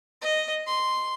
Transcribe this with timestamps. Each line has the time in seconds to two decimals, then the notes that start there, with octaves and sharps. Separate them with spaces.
0.22 D#5
0.67 C6